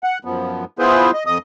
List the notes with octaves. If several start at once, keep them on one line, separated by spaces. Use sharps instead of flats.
F#5
F#2 F3 B3
B3 E4 F4 G#4 B4 C5
D#5
F2 D#5 D#6